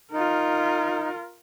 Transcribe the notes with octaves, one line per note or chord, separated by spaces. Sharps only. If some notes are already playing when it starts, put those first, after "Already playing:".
D#4 F4 A#4